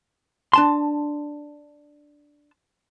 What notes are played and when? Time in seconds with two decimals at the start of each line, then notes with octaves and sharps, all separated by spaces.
0.53 D4 A5 C6